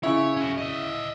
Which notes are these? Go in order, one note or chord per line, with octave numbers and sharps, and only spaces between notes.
C#3 E4 C#5
C#4 F#4
D#5 E5